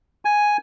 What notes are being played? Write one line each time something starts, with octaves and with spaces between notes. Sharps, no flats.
G#5